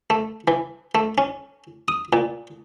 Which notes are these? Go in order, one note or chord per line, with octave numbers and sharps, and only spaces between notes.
A3
E3
A3
C#4
D#6
A#2